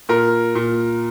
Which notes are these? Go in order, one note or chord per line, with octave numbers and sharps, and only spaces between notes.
A#2 A#4
A#2